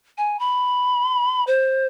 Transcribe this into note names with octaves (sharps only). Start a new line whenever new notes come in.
G#5
B5
C5